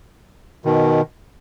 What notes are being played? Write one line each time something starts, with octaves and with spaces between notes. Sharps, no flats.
B2 D#3